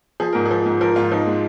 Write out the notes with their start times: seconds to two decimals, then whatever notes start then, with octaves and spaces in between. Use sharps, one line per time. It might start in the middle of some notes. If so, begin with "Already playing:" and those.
0.20 F3 G#4
0.33 G#2 A#4
0.45 G#4
0.51 F3
0.66 G#2
0.81 F3 A#4
0.96 G#2 F4
1.12 F3 D#4
1.27 G#3